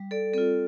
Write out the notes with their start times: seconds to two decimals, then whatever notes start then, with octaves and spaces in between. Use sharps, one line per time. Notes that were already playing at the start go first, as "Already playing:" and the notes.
Already playing: G3
0.11 A4 D5
0.34 C4 F4 A4